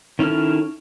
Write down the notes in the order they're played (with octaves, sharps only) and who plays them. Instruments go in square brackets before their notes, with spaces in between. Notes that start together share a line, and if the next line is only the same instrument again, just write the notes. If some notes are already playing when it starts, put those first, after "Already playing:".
[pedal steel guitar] D#3 C#4 E4 A4 F6